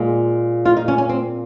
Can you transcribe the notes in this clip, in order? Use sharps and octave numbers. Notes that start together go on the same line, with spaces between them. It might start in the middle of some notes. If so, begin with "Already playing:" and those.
Already playing: A#2 G#3
F4
D#4
C#4
C#4
C4